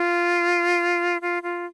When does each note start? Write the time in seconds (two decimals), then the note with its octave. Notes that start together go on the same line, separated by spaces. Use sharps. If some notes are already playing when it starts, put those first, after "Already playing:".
Already playing: F4
1.22 F4
1.43 F4